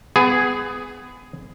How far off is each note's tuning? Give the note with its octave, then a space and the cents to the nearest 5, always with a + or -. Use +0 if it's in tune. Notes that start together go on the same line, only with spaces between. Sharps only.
B3 +25 G#4 +0